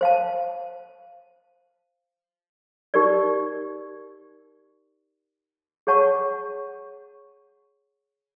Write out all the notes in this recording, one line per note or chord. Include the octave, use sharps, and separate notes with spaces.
C5 F5 A5
D#4 G4 A#4 D5
G#4 C#5 F#5 A5 C#6